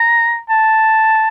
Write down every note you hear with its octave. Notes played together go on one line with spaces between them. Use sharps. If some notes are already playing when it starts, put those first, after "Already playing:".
Already playing: A#5
A5